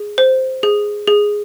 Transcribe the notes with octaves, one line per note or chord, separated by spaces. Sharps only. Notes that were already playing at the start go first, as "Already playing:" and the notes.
Already playing: G#4
C5
G#4
G#4